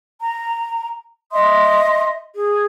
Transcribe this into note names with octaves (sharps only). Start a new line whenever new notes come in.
A#5
D#5 E5 C6 D#6
G#4